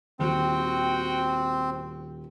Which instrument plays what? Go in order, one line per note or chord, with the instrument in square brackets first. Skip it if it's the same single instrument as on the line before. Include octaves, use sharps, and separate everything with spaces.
[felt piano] D#1 [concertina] C4 [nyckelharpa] F#4 G5